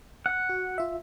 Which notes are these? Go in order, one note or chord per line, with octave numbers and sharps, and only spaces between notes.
F#5
F#4
F4 E5